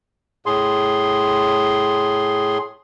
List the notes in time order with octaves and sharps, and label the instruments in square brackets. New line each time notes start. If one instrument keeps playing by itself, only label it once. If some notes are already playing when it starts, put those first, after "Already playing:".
[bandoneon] A2 G#4 C6